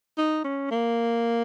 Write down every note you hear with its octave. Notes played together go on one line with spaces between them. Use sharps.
D#4
C#4
A#3